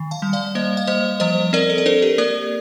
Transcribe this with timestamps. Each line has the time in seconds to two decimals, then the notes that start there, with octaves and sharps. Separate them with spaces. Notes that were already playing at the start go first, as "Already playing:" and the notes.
Already playing: D#3
0.11 F5 A5
0.22 G3
0.33 D5 F5
0.55 A#3 C5 D#5
0.77 F5
0.87 G3 C5 D#5
1.20 F3 C5 D#5
1.53 C4 A#4 D5
1.70 A4
1.78 A#4
1.86 D4 A4 C5
2.02 G4 A#4
2.18 A#3 A#4 D5